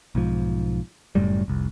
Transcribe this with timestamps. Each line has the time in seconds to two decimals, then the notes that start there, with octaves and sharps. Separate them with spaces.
0.15 B1 G#2 F3
1.15 F#1 F#2 A2 G3
1.48 F1 C2